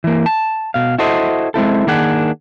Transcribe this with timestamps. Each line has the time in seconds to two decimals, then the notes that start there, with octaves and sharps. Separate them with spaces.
0.04 E3 A#3
0.26 A5
0.74 B2 F5
0.98 E4 F#4 A4 C5 D#5
1.54 G#3 C4 E4 A4
1.87 D#3 A#3 D4 G#4 F#5